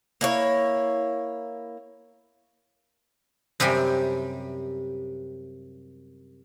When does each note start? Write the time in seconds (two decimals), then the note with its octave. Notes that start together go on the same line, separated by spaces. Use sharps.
0.21 A#3 E4 C#5
3.60 F#2 C3 G3 G5 G#5